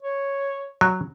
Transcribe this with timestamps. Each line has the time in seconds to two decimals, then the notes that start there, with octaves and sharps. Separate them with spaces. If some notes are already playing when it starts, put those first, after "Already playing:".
0.02 C#5
0.81 F#3